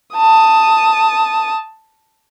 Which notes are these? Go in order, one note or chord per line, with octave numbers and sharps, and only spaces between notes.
A5 D#6